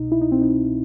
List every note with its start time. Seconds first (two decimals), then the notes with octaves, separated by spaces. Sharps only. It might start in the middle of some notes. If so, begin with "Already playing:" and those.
Already playing: C2 B2 D#4
0.12 E4
0.21 D#4
0.32 C4
0.41 D#4